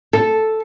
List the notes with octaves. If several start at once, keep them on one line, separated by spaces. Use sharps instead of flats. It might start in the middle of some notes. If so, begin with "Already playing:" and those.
A4